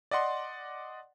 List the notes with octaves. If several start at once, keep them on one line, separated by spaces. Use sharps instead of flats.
D5 D#5 F#5 C6